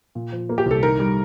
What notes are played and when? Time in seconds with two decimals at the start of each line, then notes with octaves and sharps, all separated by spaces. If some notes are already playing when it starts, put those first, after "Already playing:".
0.15 A#2
0.32 F3
0.49 A#3
0.58 G4
0.66 C2 A4
0.83 D#3 A#4
0.99 G3